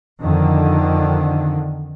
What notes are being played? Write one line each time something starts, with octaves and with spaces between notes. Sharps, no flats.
F2 D3 D#3